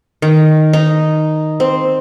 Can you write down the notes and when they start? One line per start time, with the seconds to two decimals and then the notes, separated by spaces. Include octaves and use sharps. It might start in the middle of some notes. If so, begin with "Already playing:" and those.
0.22 D#3
0.73 D#4
1.60 C4